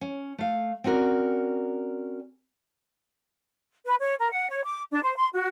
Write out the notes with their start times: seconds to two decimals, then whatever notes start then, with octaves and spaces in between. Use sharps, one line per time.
0.01 C#4
0.38 A3 F5
0.84 C4 C#4 F#4 A#4 D5
3.86 B4
4.01 C#5
4.19 A#4
4.32 F#5
4.50 C#5
4.64 D6
4.91 D4
5.03 C5
5.17 C6
5.33 F#4